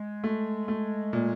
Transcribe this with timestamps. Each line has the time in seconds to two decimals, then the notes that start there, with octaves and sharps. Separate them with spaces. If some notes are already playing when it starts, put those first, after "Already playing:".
Already playing: G#3
0.24 A3
0.68 A3
1.13 A#2